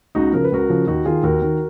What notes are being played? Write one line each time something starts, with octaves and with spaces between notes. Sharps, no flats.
C#2 D#4 F#4
C#3 F3 A#4
B4
C#2 F#4 A#4
C#3 F3
D#2 D#4 F#4
D#3 F4 G#4
D#2 F#4 A#4
D#3